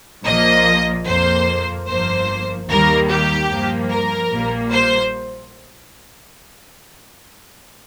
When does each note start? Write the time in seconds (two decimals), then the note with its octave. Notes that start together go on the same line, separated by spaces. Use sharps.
0.25 A#1 A#2 F3 A#3 D#5
1.07 F2 F3 A#3 C5
1.87 G1 G2 F3 A#3 C5
2.68 D#2 D#3 G3 A#3 A#4
3.09 G4
3.49 G2 F3 A#3
3.90 A#4
4.30 A#1 A#2 G3 A#3
4.72 C5